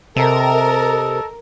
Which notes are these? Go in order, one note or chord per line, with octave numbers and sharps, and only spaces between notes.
C3 A4 A#4 D#5 A5